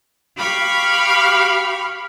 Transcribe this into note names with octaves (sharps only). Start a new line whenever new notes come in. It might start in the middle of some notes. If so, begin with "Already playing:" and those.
G4 F5 B5 C#6